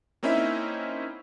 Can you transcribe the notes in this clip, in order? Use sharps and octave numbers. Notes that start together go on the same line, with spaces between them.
A#3 C4 C#4 D#4 E4 E5